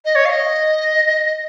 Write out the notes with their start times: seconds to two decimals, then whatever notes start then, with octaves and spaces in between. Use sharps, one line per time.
0.05 D#5
0.15 C#5
0.25 F5
0.30 D#5